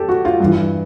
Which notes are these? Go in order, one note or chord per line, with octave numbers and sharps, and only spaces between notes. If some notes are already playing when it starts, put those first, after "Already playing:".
Already playing: G4 A4
F#4
F4
G2 E3